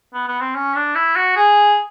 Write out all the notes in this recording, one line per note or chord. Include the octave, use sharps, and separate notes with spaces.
B3
B3
C4
C#4
D4
E4
F#4
G#4